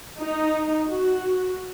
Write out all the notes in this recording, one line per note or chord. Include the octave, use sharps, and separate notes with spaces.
D#4
F#4